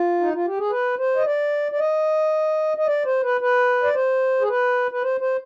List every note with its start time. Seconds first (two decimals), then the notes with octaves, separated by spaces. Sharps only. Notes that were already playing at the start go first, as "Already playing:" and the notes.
Already playing: F4
0.20 D#4
0.33 F4
0.46 G4
0.58 G#4
0.71 B4
0.98 C5
1.17 D#5
1.26 D5
1.72 D5
1.79 D#5
2.77 D#5
2.87 D5
3.05 C5
3.23 B4
3.41 B4
3.83 D5
3.95 C5
4.41 G#4
4.49 B4
4.91 B4
5.03 C5
5.21 C5